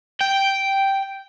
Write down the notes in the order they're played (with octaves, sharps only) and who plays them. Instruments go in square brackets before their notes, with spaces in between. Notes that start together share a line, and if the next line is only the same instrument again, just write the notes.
[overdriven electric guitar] G5